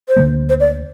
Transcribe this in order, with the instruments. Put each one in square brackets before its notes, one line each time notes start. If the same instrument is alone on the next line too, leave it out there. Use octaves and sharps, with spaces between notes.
[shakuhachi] C5
[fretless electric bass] D2 D3 G3 A#3
[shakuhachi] C5
D5